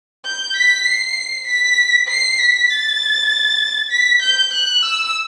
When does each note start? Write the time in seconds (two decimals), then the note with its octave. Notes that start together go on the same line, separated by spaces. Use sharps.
0.25 G6
0.56 B6
0.86 C7
1.47 B6
2.08 C7
2.39 B6
2.70 A6
3.92 B6
4.22 G6
4.53 F#6
4.83 E6